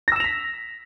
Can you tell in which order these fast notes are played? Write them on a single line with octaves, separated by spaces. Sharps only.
A#6 E6 E7 F7 B6